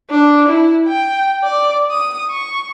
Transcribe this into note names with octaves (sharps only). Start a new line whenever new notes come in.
D4
E4
G5
D5
D#6
C#6